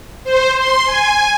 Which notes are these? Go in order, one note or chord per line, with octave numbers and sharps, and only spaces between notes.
C5
C6
G#5